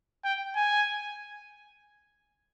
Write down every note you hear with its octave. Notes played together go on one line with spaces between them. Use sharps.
G5
G#5